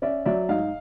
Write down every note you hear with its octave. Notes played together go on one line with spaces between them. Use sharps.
C#4 D5 E5
F#3 D5 E5
G#2 D#5 F5